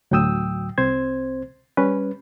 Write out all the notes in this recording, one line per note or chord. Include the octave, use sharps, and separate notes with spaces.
D2 A2 F#3 G5 D#6 E6
C2 C4 C5 G#6
G3 C#4 B4